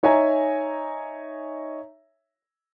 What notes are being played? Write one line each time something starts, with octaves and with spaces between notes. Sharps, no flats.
D#4 C#5 E5 G#5 A#5